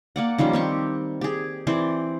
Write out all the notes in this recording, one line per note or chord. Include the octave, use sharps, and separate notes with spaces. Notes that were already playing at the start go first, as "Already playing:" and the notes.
A#3 D5 F#5
D#3 F3 G3 C#4
C4 G4 C#6
G4 G#4
E3 C4 C5 D5